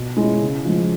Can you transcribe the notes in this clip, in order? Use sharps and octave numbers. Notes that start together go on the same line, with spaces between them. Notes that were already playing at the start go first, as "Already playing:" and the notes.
Already playing: B2
G#3 C#4 E4
C#3
F3 G#3